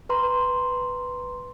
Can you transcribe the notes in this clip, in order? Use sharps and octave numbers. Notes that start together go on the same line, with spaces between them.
B4 A#5 C6